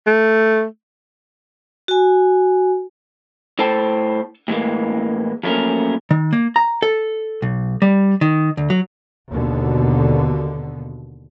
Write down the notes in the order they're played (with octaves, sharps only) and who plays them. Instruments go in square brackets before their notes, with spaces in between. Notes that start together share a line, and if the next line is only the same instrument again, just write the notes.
[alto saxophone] A3
[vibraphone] F#4 G#5
[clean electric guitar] A2 A4 C5 G5 A5
A2 E3 G#3 A#3
F3 F#3 A3 A#3 C#4 A#4
[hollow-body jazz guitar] D#3
A#3
A#5
A4
B1
G3
D#3
D2
F#3
[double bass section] D#2 B2 D3